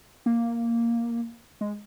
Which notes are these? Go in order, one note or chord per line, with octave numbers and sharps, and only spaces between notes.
A#3
G#3